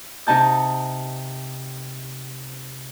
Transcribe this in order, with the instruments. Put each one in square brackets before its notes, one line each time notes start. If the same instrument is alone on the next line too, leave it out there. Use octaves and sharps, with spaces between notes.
[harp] C3 D#4 A5 G6